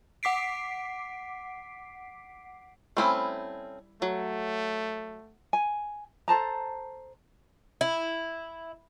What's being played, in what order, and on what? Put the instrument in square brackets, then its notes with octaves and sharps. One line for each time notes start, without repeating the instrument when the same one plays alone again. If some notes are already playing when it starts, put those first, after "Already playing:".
[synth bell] F#5 D6 B6 C7 D7
[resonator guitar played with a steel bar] G3 E4 G#5 [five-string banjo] A3 C4 C#4
[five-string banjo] F#3 [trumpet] A3
[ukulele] G#5
A4 C5 A5 A#5
[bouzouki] E4